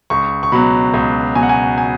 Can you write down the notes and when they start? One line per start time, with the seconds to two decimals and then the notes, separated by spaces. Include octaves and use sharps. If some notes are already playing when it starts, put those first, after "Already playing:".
0.10 C#2 C#6
0.43 C#6
0.52 B2 F#3 B5
0.94 C#2
1.35 B2 F#3 G#5
1.43 F#5
1.49 G#5
1.78 G#5